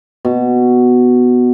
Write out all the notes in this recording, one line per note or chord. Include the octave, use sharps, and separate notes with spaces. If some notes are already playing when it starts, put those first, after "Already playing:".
B2